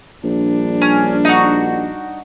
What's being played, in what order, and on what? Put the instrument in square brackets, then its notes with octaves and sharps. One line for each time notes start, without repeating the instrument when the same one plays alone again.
[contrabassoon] A#1 [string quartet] G3 D4
[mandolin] C#4
D#4 F#4